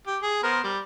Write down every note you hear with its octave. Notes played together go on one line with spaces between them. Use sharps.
G4
G#4
B3 A#4 C5
G3